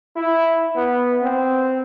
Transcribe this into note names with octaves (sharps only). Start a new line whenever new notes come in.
E4
B3
C4